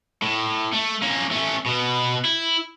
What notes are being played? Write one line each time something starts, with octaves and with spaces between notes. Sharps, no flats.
A2
A3
A#3 C#4
A3 C#4
B2 B3
E4